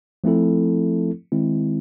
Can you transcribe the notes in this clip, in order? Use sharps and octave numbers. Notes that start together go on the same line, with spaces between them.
F3 A3 C4 E4 A4
D#3 G#3 C4 E4